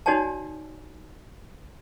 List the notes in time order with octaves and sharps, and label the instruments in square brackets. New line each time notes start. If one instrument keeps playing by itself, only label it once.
[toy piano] D#4 F#4 C#5 D5 G#5 A5